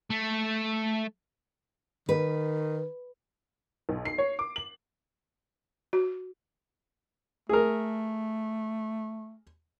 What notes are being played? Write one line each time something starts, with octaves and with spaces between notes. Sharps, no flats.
A3
D#3 B4
B1
C7
C#5
D6
F#7
F#4
A3 G#4 A#4